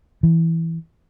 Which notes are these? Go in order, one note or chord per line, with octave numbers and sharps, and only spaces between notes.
E3